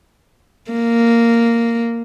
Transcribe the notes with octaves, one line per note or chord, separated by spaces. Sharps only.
A#3